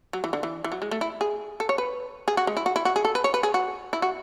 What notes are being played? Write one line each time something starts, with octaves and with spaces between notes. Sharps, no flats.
F#3
E3
D3
E3
E3
F#3
G#3
A3
E4
G#4
A4
C#5
B4
G#4
F#4
G#3
E4
F#4
E4
F#4
G#4
A4
B4
C#5
B4
G#4
F#4
E4
F#4